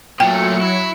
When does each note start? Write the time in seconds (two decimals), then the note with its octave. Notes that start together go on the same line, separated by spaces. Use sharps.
0.20 A#2 F#3 A3 G5 C#7
0.61 E4